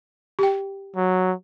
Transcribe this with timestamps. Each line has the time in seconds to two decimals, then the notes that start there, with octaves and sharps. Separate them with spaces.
0.39 G4 G5
0.96 F#3